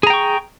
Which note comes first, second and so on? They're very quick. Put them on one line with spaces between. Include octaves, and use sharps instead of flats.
G#4 A#5 G5 C#6